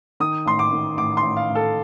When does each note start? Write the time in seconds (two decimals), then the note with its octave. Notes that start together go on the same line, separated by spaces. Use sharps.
0.20 D#3 D#6
0.46 A1 C6
0.59 D6
0.72 D#3
0.97 A1 D6
1.17 C6
1.23 A1
1.37 F5
1.49 A1
1.55 A4